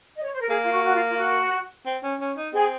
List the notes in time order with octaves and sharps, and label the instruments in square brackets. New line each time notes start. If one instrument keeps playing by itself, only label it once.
[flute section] D#5
C#5
C5
A#4
[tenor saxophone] A#3 [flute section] G#4
[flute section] F4
F#4
F#4
F4
F4
F#4
[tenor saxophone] C4
C#4
C#4
D#4
[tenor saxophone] C4 [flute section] G#4